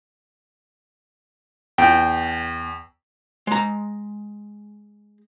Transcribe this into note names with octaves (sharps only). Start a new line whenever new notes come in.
E2 G5
G#3 A#5